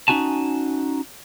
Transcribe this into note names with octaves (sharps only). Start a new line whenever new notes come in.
C#4 D#4 F#4 G#5 A5